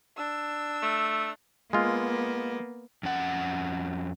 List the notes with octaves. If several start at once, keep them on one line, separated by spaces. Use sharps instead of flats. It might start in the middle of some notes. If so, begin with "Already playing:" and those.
D4 E6
A3
G#3 A#3 B3 F4
F2 C#4 F#5